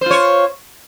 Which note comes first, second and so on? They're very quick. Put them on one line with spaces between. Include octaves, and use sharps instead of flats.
C5 F4 C#5